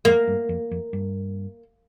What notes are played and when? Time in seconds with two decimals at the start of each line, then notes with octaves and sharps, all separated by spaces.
0.05 F2 A#3
0.27 G2
0.49 F2
0.71 F2
0.93 G2